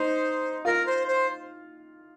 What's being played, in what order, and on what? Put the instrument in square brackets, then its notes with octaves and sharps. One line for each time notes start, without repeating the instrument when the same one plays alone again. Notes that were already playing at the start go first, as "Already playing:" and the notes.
Already playing: [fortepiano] D#4 [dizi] C5
[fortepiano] F4 [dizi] A#4
[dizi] C5
C5